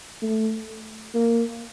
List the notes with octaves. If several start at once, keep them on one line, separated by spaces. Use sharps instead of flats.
A3
A#3